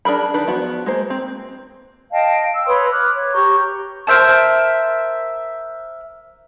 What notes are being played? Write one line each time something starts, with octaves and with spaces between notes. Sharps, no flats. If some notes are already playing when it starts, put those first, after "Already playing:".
D4 G#4 A#4 B5
D#3 D4 B4
F3 B3 F#4
G#3 A#3 C5
C4
D#5 F5 G5 A5
E6
B4 C#5 C6 D#6
D6 F6 F#6
C#5
G4 A#5 C#6 G6
A#4 C5 E5 A5